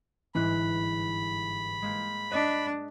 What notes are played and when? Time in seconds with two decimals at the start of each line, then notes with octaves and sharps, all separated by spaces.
0.35 G1 G#2 E3 B5 F#6
1.82 G#3 A#3 G6
2.32 D4 D#5 F#6 B6